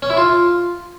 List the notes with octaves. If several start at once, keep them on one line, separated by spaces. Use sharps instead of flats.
C#4
E4
F4